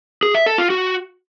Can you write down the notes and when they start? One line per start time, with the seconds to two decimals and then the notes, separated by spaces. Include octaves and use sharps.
0.23 G#4
0.34 E5
0.46 A4
0.58 F4
0.70 F#4